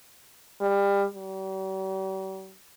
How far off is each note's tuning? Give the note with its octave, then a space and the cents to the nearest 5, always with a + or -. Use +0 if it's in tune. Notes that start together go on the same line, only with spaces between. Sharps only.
G3 +25
G3 -45